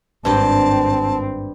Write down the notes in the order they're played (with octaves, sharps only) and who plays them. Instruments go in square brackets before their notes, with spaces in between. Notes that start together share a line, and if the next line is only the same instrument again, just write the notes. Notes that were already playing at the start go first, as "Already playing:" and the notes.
[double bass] G#1 C4 [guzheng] G2 G4 [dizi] A5